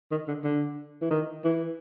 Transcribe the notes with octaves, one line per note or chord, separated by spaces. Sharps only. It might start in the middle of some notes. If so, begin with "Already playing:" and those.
D#3
D3
D3
E3
D#3
E3